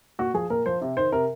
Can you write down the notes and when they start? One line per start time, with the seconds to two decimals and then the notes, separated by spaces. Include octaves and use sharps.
0.19 A#2 F#4
0.34 F3 G#4
0.50 A#2 A#4
0.66 F3 C5
0.81 C3
0.97 D#3 C5
1.12 C3 A#4